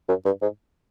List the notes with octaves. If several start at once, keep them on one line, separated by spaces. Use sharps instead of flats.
F#2
G2
G#2